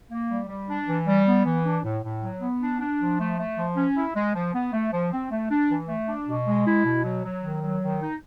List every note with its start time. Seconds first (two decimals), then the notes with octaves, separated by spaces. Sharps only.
0.10 A#3
0.30 G3
0.48 G3
0.68 D4
0.87 E3
1.06 G3
1.26 B3
1.44 E3
1.64 D4
1.83 A2
2.03 A2
2.22 F#3
2.41 B3
2.61 D4
2.80 D4
3.00 F3
3.19 A3
3.38 A3
3.57 F3
3.76 C#4
3.95 E4
4.15 G#3
4.34 F3
4.54 B3
4.73 A3
4.91 F3
5.12 C4
5.31 A3
5.50 D4
5.69 E3
5.88 A3
6.08 D4
6.27 B2
6.46 G#3
6.65 E4
6.85 B2
7.03 F#3
7.24 F#3
7.42 D#3
7.62 F#3
7.82 D#3
8.01 D#4